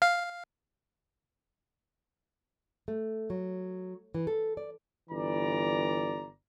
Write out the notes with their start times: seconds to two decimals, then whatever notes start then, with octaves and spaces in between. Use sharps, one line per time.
0.02 F5
2.88 A3
3.30 F#3
4.15 E3
4.27 A4
4.57 D5
5.09 G1 E3 D5 A#5